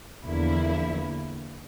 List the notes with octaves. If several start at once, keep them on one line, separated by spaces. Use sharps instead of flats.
E2 D3 F3 A#3 E4